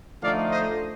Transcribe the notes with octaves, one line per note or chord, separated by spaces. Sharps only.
D3 F3 A3 D#4 D5 F5
C5 D#5